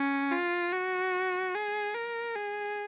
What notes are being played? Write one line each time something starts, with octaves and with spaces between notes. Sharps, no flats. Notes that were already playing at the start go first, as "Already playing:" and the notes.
Already playing: C#4
F4
F#4
G#4
A#4
G#4